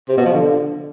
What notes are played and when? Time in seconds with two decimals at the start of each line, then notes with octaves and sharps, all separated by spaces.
0.09 C3
0.17 B2
0.26 F3
0.34 D3